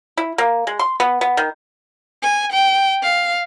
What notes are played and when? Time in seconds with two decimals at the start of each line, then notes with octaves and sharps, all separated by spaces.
0.17 E4
0.38 A#3
0.67 G#3
0.79 C6
1.00 B3
1.21 B3
1.37 D#3
2.23 G#5
2.52 G5
3.02 F5